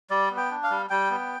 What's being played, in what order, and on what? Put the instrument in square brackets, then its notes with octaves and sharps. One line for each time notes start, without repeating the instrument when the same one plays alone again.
[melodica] G3 D5
B3
G5
D4
F5
G3
G3 G5
B3